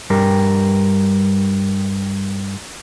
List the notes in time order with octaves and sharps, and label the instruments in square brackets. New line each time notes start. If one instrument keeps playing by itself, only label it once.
[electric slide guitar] G2 G3 G4 A#4